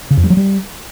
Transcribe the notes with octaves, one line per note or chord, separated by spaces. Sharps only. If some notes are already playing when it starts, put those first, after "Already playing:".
C#3
F2
G3
F#3
G3